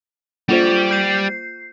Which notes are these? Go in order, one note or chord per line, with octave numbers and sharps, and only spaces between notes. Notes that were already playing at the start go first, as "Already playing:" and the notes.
G3 A#3 F4 G4 C5
G6 C7